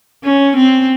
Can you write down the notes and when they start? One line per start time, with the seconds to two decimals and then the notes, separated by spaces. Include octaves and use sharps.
0.24 C#4
0.56 C4